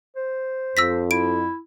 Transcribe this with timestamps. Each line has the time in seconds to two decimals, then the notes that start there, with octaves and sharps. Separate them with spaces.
0.16 C5
0.77 F2 E6 A#6 B6
1.11 E4 D7